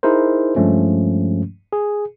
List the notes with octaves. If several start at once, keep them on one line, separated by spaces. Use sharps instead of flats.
D#4 E4 G#4 A#4 C5
G2 F3 G#3 A3 C#4
G#4